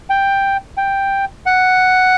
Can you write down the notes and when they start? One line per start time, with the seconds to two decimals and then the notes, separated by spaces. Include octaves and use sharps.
0.10 G5
0.77 G5
1.46 F#5